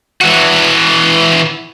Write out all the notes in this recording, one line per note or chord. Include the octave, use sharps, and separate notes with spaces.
E3 F#4